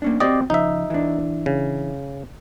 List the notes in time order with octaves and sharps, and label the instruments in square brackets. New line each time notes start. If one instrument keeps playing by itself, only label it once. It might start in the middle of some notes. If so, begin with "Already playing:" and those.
[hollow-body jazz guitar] A#3 C#4 D4
[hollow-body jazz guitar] C4 F#4 G5 [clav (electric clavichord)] G4 D5 D#5
[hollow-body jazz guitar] C#3 F3 [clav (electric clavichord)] D#4 E5
[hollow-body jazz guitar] E3 D4
[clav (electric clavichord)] C#3